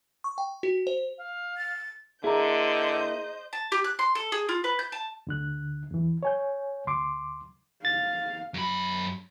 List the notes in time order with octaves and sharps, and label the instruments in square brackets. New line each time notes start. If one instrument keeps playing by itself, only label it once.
[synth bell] C#6
G5
F#4
C5
[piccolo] F5
[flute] A6
[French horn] D3 [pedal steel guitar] A#3 E4 [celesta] G#4 A#5 [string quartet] C5 D#5 G6
[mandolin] A5
G4
F#6
C6
A4
G#4
F4
B4
G6
A5
[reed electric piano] D2 D3 F#6
E2 E3
C#5 G#5 G6
D2 C6 D6
[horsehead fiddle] F5 [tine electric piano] A6
[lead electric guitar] F#2 B5